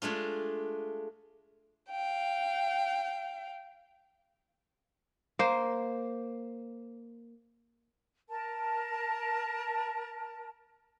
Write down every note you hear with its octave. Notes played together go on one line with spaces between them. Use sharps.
G#3 A3 D4 F4
F5 G5
A#3 C5
A#4 A5